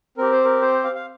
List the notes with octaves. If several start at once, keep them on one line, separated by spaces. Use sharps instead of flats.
C4 G4 A#4
C5
A#4
C5
F5
F5